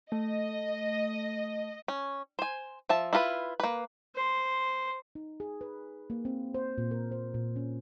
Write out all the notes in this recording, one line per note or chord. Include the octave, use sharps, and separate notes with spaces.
A3 D#5
C#4
C5 G#5
F3 E5 A5
E4 F4 A#4 B4
A#3 B4
C5
D#4
G#4
B4
A#3
C4
C5
A#2
A#4
C5
A#2
C#4